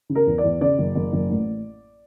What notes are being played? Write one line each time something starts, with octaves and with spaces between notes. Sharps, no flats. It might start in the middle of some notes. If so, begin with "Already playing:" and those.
C#3
A#4
E2
D5
E2
C#3 D5
F#1
F#1
F#1
A1